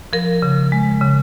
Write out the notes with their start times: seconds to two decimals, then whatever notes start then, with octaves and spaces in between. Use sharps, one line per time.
0.13 F3 A#4
0.42 C#3
0.72 G#3
1.01 C#3